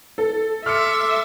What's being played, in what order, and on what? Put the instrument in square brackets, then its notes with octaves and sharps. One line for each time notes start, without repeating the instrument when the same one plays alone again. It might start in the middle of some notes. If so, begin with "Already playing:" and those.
[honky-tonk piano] A4
[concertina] A4 C6 D6 [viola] E5 [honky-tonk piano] F6 C#7